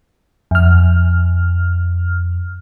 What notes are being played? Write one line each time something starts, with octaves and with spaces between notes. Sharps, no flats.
F2 F6